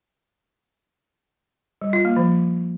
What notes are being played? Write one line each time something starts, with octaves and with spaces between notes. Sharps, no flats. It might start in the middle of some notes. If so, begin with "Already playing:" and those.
G3
F4
A#3
F3